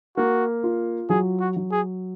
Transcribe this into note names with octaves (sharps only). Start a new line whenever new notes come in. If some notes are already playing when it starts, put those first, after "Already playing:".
A#3 F#4
F4
F#3 G#4
F#4
F#3
G#4